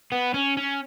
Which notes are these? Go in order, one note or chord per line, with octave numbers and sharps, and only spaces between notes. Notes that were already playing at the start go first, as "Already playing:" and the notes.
B3
C#4
C#4